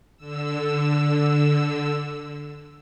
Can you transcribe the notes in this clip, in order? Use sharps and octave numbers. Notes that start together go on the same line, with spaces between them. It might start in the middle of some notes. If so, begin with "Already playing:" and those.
D3 E6